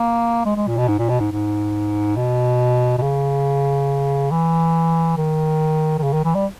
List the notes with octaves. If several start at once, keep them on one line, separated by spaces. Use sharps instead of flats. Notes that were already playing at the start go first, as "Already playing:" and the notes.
Already playing: A#3
G#3
G#3
A#2
B2
G#2
A#2
B2
G#2
G#2
B2
B2
C#3
E3
D#3
D#3
C#3
D#3
E3
G3